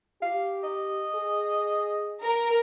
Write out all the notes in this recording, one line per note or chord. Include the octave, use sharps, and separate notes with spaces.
G4 F5
D#5
G#4
A#4